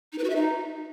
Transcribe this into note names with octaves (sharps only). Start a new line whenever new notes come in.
D#4
B4
F#4
E5
D#4